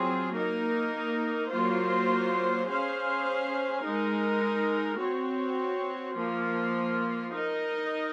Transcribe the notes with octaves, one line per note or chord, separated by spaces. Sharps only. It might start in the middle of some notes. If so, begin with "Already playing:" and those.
Already playing: F#3 C4 F4 G#4
A#3 D#4 A#4
F#3 A#3 F4 C5
C#4 G#4 C5 F5
G#3 D#4 A#4
C4 F#4 C#5
F3 A#3 F4
D#4 A#4 D#5